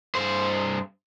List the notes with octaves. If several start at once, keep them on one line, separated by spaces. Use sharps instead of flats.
G2 C5